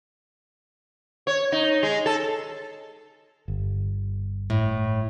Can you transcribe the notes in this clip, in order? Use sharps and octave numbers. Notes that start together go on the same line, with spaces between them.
C#5
D#4
G#3
A4
G1
A2